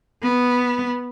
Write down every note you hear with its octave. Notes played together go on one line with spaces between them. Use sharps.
B3